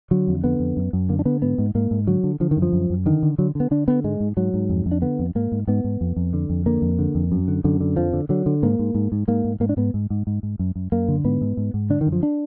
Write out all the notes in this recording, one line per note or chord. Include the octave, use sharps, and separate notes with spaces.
D3 F#3
F2
D3 B3
F2
F#2
F#2
D3 A#3
D4
D3 B3
G#2 B3
G#2
G#2 A#3
G#2
D3 F#3
D3
D3 F3
D#3
F#2
F3
F#2
F#2
D3 D#3
D3
D3 F#3
D3 B3
D3 D4
D3 B3
G#2 G#3
G#2
G#2 F#3
G#2
F2
F2
D4
D3 B3
F2
G#2 A#3
G#2
G#2 B3
G#2
F2
F2
D3
F2
D3 A#3
F2
D3
F2
F#2
D3
F#2 D3
D3
F2 F3
D3
D3 F#3
D3
G#2 A#3
G#2
G#2
G#2
G#2 A#3
G#2
G#2 A#3
D4
G#2 B3
G#2
G#2
G#2
G#2
F#2
F#2
F#2 A#3
D3
G#2 B3
G#2
G#2
G#2
D3 D4
D#3
F#2
F3
D4